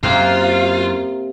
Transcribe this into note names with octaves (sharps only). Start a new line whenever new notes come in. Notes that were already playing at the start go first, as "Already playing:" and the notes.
F#2 C3 A#3 C4 F4 A#4